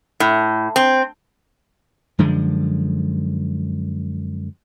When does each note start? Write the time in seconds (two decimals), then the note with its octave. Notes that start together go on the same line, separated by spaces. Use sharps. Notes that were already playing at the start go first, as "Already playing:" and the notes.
0.20 A2
0.76 C4
2.19 F#2 D3 F3 G#3